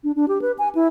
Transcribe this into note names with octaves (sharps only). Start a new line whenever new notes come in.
D4
D4
G4
B4
G#5
E4